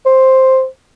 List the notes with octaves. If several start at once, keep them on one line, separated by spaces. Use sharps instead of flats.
C5